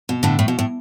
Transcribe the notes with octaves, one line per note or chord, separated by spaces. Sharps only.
B2
A2 D3
A2
B2
A2